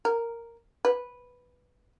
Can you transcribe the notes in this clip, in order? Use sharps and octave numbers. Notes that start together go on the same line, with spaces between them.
A#4
B4